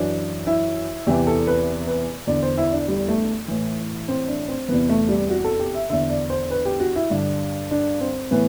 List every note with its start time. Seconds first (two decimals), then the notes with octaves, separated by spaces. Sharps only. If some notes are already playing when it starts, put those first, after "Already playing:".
Already playing: F#2 E3 D4
0.47 E4
1.07 E2 C3 E3 G4
1.27 A4
1.47 B4
1.87 B4
2.27 E2 D3 D5
2.42 C5
2.58 E4
2.73 D4
2.88 G3
3.08 A3
3.48 A2 E3
4.08 C4
4.28 D4
4.48 C4
4.68 E2 C3 E3 B3
4.89 A3
5.09 G3
5.30 F#4
5.44 A4
5.59 G4
5.74 E5
5.89 E2 D3 E5
6.10 D5
6.30 C5
6.51 B4
6.65 G4
6.80 F#4
6.96 E4
7.10 G2 D3 D4
7.71 D4
8.01 C4
8.31 A2 E3 B3